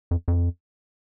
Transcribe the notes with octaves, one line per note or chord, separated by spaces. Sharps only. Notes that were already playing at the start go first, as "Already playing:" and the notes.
F2
F2